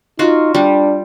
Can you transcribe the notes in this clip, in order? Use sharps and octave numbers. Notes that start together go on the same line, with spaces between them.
D#4 F4 F#4
G3 D4